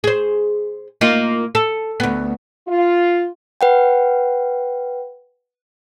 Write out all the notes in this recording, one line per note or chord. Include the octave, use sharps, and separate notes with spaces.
G#4 C5
A#3 D#4 F4
A4
D2 B3
F4
B4 F#5 G5